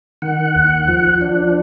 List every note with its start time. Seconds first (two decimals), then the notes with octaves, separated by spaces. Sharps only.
0.22 D#3 F#5
0.55 D#2
0.88 F3
1.21 D4